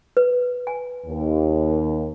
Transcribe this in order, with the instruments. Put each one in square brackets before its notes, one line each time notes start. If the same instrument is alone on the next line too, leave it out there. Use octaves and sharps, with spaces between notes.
[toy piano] B4
G#5
[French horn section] D#2